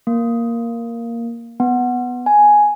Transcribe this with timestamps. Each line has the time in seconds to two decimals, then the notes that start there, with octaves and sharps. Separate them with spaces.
0.07 A#3
1.60 B3
2.26 G#5